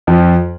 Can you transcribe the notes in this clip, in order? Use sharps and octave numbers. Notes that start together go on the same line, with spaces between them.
F2 F3